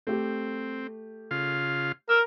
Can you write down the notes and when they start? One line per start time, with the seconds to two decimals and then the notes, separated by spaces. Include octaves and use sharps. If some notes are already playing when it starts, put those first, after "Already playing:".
0.07 A3 C4 G4
1.31 C#3 F4 F5
2.09 A#4 E6